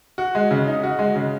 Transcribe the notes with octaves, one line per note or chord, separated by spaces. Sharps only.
F#4
G#3
C#3
D#4
F#4
G#3
C#3